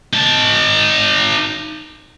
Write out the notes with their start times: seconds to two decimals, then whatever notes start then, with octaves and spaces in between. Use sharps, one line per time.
0.13 D#4 A5